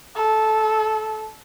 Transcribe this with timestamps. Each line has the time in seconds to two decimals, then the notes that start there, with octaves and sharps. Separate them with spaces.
0.16 A4